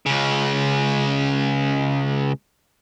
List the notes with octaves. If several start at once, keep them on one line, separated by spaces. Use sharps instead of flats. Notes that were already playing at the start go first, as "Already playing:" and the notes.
C#2 C#3